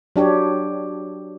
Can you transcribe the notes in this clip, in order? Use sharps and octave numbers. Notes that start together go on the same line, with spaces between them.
F#3 D4 G4 C#5